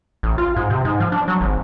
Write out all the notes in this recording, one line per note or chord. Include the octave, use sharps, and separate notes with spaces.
A1
F4
G#2
C3
G#2
F3
D4
F#3
G#1